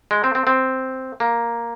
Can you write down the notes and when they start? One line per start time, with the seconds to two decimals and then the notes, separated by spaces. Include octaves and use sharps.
0.11 G#3
0.24 C4
0.35 C4
0.47 C4
1.20 A#3